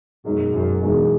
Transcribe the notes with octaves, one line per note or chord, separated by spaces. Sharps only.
F#2 B2 G#3 D#4 G#4
F#2
E2 B2 G#3 D#4 G#4